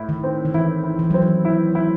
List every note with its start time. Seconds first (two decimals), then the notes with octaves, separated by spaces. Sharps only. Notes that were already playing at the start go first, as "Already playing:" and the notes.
Already playing: A2 E4
0.09 D#3
0.23 C4
0.45 D#3
0.54 E3 E4
0.84 E4
0.99 E3
1.10 F#3 C4
1.22 E3
1.45 E4
1.75 E4